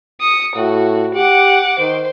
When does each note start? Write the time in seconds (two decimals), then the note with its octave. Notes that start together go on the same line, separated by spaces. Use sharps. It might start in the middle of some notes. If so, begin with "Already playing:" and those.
0.21 D#6 C#7
0.56 A2 F#4
1.15 G4 F#5 D6
1.79 D#3 C5